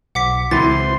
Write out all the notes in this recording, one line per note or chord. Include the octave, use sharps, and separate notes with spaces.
B1 F#5 D6 B6
C#2 E3 C4 E4 C5 C6 A6